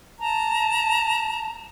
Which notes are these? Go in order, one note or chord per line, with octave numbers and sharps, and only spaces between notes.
A5 A#5